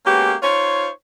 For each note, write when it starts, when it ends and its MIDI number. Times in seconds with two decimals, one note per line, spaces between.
0.06 0.35 56
0.06 0.35 58
0.06 0.35 59
0.06 0.35 61
0.06 0.35 66
0.06 0.35 67
0.43 0.88 63
0.43 0.88 65
0.43 0.88 72
0.43 0.88 73